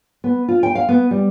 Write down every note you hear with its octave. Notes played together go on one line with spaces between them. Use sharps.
B3
F4
G5
F5
B3
G3